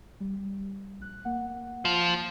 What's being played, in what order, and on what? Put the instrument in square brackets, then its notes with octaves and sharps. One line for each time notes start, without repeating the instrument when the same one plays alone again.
[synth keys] G3
A#1 F#6
A#3 F#5
[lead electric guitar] F3